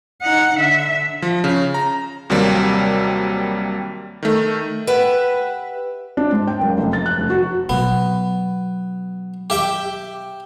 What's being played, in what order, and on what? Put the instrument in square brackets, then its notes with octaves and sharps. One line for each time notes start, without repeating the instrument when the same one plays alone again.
[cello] D#4 F#5
D3 E5
[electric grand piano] F3
C#3
A#5
D#2 C3 F#3 G3 A#3
D#3 A3
[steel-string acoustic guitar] G4 B4 E5 F#5
[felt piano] D4
G#2
G5
F#1
F1
A6
F#6
F1
F#4
[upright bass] B2 F#3 [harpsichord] B3
[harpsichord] G4 E5 G5